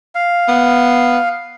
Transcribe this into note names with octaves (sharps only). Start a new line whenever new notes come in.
F5
B3